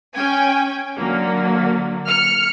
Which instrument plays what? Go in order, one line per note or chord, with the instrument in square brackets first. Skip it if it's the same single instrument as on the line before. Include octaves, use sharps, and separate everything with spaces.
[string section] C#4 G5 G#5
D3 F#3 A#3
F6 C#7